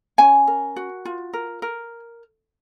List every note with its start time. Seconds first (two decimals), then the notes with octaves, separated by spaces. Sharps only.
0.18 C#4 G#5
0.47 A#4
0.76 F#4
1.05 F4
1.33 A#4
1.62 A#4